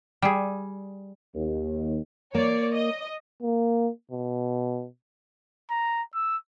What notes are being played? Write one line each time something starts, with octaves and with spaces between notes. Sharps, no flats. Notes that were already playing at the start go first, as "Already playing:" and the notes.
G3 G#4
D#2
A#3 C#5 D5
D#5
A#3
B2
A#5
E6